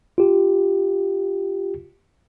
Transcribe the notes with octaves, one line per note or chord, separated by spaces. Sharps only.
F4 G4